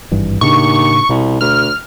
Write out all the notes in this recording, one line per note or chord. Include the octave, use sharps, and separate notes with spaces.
G#1 G2 E3
D#2 A2 C#3 D4 C#6
C2 B2
D2 F6